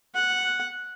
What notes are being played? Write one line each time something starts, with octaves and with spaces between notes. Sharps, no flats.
F#5